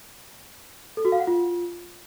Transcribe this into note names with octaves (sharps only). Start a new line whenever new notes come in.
A4
F#4
F5
F#5
F4